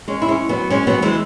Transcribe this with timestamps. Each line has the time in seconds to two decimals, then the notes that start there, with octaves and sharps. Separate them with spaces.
0.08 G#3 C#4
0.22 E4
0.28 G#3 C#4
0.49 F#3 B3
0.70 G#3 C#4
0.87 F#3 B3
1.02 E3 G#3